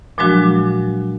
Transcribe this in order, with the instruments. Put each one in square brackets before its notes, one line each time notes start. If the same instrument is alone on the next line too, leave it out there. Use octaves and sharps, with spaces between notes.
[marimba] A#2 F3 F#3 G#3 D4 F#4